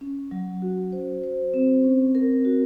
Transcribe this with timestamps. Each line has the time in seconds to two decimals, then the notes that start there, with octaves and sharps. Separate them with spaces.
0.01 C#4
0.31 F#3
0.62 F#4
0.92 C5
1.24 C5
1.54 C4
1.84 C#4
2.15 A#4
2.45 F#4